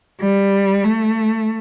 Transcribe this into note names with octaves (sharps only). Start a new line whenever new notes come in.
G3
A3